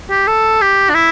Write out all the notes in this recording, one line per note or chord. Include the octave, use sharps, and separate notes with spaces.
G4
A4
G4
D4
E4